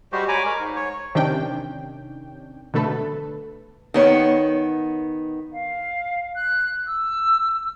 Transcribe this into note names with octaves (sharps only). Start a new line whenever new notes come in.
G3 G#3 F#4 G4 C5
C#5 G#5 A#5 B5 D6
G#3 A#4
G#2
C#5
C3 D#3 C#4 D4 G5
B2 D3 A3 A4 B4
D#3 B3 C#5
F5
F#6
E6